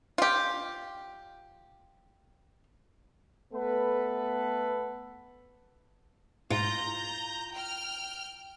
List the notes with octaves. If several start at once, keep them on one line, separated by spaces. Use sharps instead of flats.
F4 G4
A3 B3 A4 B4
G#2 F4 A#5 G6
G5 F6